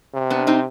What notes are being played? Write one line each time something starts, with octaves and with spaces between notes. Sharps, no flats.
C3
B3 D4
C4 D#4